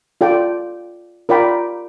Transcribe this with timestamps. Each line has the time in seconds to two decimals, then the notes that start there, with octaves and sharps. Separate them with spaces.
0.21 F4 A4 D5 G5
1.29 F4 A#4 D5 G5 B5